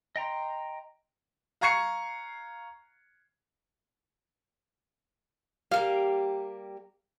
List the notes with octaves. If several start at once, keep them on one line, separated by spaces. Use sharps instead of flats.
D#5 G5 A#5 C6
F5 A#5 C#6 G#6 C7 C#7
G3 A#3 G4 F5